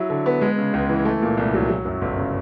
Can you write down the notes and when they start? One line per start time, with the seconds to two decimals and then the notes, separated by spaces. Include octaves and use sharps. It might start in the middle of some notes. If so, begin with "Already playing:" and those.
Already playing: F#3 E4
0.10 D3
0.26 B3
0.41 G#3
0.58 C#3
0.73 C#2
0.89 E3
1.05 A3
1.22 A#2
1.37 C2
1.54 F#3
1.69 F#3
1.85 F#2
2.01 G1
2.17 C#3